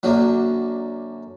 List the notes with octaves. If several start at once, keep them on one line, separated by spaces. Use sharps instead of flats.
F#2 D3 F#3 A#3